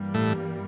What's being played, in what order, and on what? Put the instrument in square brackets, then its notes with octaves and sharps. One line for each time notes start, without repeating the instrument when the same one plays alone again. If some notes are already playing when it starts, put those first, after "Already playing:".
Already playing: [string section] G2 E3 G3 A#3
[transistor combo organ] A2 A3